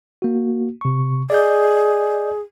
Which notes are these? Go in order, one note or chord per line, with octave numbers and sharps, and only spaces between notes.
A#3 F#4
C3 C#6
G#4 D5 D#5 G6